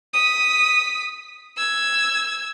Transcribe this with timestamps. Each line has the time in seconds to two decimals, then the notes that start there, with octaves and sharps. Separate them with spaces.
0.13 D#6 B6
1.57 E6 G#6